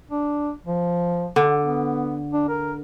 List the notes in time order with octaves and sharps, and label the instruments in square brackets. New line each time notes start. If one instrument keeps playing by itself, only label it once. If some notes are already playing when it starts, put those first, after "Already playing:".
[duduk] D4
F3
[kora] D3
[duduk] B3
D4
A#4